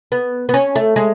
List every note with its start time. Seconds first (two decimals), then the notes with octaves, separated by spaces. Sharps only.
0.12 B3
0.49 B3
0.54 C#4
0.75 A3
0.96 G#3